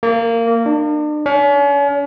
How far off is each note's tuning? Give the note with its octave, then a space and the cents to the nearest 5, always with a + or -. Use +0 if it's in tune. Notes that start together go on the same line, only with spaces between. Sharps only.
A#3 -20
D4 +40
C#4 +40